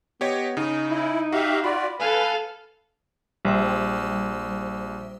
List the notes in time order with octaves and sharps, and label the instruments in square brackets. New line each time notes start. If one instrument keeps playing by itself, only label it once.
[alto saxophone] B3 [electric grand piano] G4 C#5 D#5
[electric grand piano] C#3 [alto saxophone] D#4
[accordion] E4
[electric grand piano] F#4 [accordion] G4 E5 F5
[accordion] F4 F#4 D5 [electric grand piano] B5
[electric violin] A4 F5 [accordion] B4 G#5
[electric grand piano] A#1 [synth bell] G3 C5 E5